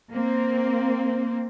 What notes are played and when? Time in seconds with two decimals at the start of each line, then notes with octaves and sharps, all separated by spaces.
0.12 A#3 C4